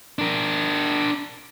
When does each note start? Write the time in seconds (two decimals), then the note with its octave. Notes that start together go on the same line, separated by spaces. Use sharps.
0.19 D4 A#4